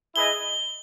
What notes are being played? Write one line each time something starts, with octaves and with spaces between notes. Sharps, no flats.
E4 G#4 B4 D#5 G7